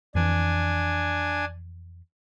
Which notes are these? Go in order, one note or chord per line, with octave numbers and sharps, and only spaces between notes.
F2 E3 D4 G#5